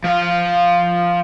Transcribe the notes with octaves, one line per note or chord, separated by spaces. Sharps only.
F3 F5